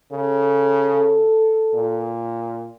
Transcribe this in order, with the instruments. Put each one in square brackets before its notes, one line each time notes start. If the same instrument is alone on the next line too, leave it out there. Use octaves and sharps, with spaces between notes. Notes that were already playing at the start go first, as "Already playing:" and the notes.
[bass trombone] C#3 [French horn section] A4
[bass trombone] A#2